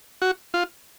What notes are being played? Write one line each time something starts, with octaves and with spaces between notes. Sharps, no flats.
F#4
F4